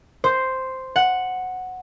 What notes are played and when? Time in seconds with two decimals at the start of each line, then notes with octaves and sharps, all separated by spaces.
0.24 C5
0.96 F#5